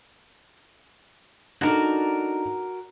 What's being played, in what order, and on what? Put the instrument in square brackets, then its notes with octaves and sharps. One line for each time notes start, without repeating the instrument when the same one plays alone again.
[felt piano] D4 D#4 A4 [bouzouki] F#4 A#4 D5